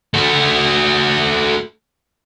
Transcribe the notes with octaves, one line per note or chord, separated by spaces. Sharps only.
A3 F#4